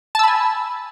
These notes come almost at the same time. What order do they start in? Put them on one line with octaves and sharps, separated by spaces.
A5 E6 B5 G#5